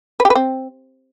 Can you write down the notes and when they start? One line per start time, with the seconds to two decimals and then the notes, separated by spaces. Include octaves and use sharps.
0.20 B4
0.25 G4
0.30 B4
0.35 C4